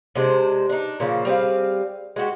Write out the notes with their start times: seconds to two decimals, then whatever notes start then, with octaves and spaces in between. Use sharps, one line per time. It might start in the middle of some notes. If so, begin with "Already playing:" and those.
0.15 C3 G#3 D4 C5
0.69 D4 D#4
1.00 A#2 C#3 F3
1.25 G3 C4 G#4 F5
2.16 G#3 F#4 G4